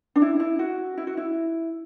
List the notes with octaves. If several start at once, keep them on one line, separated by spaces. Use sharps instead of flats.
D4
E4
E4
F#4
E4
F#4
E4